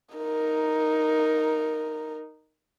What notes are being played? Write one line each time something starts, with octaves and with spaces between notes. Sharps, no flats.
D#4 A#4